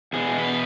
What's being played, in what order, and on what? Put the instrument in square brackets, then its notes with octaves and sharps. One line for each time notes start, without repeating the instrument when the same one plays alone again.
[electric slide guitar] E2 B2 G#4
B4